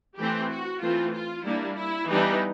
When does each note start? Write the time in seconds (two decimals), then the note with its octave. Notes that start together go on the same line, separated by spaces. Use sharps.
0.17 E3 A3 C4 G4
0.49 F#4
0.81 E3 A3 C4 F4
1.12 F4
1.45 G3 A#3 D4 E4
1.76 E4
2.08 E3 G3 B3 D4 D#4